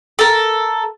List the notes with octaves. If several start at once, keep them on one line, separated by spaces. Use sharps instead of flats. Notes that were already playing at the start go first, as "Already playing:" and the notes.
A4 A#4